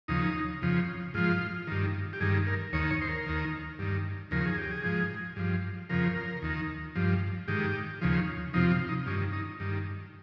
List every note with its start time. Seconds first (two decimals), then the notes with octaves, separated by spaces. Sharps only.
0.08 D#2 C#3 F3 D#4
0.62 F2 C#3 F3
1.14 G#2 F3 F4
1.67 G2 D#3
2.13 G4
2.20 G2 D#3 G#4
2.47 A#4
2.73 D#2 D#3 C#5
2.90 C#5
3.01 C5
3.09 A#4
3.26 D#2 D#3
3.79 G2 D#3
4.31 D#2 C#3 F3 A#4
4.45 G#4
4.58 G4
4.71 G#4
4.84 G#2 F3
5.36 G2 F3
5.90 F2 C#3 F3 A#4
6.42 D#2 D#3
6.95 G2 F3
7.48 G#2 D#3 G4
8.01 D#2 C#3 F3
8.53 F2 C3 F3 D#4
8.71 F4
8.89 D#4
9.06 G2 C#4
9.10 D#3
9.33 D#4
9.60 G2 D#3